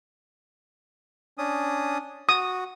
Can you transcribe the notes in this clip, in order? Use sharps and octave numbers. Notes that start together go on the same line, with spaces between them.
C#4 D4 D#6
F#4 D#6